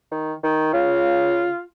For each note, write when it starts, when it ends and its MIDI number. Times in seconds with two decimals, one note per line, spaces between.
0.11 0.33 51
0.43 0.72 51
0.73 1.49 49
0.73 1.63 65